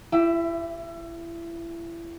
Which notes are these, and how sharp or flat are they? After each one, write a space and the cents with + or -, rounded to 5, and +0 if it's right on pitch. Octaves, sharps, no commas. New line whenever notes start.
E4 +30 G4 +0 E5 +0